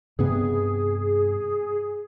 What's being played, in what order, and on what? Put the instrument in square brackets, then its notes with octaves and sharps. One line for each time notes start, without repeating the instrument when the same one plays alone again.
[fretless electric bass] G2 C3 B3 [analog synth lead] G#4